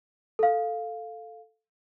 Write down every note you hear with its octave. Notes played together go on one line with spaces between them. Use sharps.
A4 F5